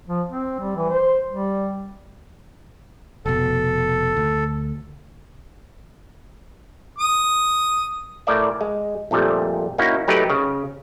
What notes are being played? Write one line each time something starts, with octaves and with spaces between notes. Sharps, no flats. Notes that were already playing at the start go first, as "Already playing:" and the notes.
F3
C4
G3
E3
C5
G3
F1 B2 A4
D2
D#6
A2 A#4 D5 E5
G#3
A#1 F2 A#2 G3 A3
A#3 C#4 D#4 E4 F#4
F#3 A3 D#4 G4 A#4 B4
C#3